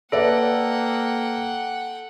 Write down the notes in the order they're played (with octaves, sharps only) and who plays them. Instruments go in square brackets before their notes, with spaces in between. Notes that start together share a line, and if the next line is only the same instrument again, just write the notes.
[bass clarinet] A#3 [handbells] A4 [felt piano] B4 D5 E5 [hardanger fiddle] F#5 G5